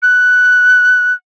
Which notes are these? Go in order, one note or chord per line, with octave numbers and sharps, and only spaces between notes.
F#6